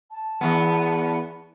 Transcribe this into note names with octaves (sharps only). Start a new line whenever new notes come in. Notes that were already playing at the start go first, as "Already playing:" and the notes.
A5
E2 B3